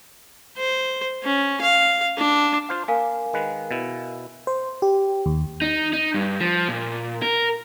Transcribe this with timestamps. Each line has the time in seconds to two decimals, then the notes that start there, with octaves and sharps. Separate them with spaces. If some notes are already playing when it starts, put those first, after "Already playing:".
0.57 C5
1.24 C#4
1.61 F5
2.18 D4
2.69 F4 C5 F5
2.88 A#3 A#4 F5 G#5
3.33 D#3 G#3 B4
3.71 B2 E4
4.47 C5
4.82 G4
5.26 D#2
5.62 D#4
5.93 D#4
6.14 G2
6.41 F3
6.68 A#2
7.22 A#4